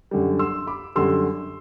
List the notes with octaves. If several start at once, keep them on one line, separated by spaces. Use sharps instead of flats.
F#2 D3 G3
C6 E6
B5 D6
F#2 D3 G3 C6 E6